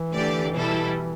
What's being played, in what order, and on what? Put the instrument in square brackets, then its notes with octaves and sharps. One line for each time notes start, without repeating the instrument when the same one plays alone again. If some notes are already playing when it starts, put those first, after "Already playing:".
Already playing: [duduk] E3
[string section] D3 A3 G4 D5
B2 G3 E4 A4